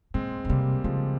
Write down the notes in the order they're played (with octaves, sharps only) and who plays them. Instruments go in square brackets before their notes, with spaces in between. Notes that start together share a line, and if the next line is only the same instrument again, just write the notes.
[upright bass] A#2 [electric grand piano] G#3 C4
[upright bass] C#3
[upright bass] C3 [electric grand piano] G3 A#3
[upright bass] C#3 [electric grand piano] F3 G#3